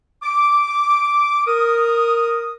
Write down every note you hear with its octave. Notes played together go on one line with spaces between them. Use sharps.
D6
A#4 D#6